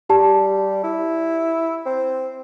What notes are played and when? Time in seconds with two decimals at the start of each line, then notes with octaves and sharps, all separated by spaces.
0.10 G3 G4 A5
0.83 E4
1.86 C4